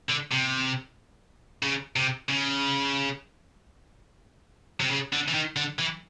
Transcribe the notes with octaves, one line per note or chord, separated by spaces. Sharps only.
D3
C3
C#3
C3
C#3
C3
C#3
D3
E3
D#3
D3
E3